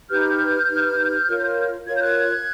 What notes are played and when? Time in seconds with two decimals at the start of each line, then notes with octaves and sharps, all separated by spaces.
0.10 D#4 G4 B4 F6 G6
0.68 D#4 G4 B4
1.28 F4 A#4 C#5
1.86 F4 A#4 C#5 G#6
1.94 G6
2.01 F#6 G#6